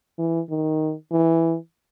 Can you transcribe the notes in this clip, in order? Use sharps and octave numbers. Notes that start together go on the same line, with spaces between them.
E3
D#3
E3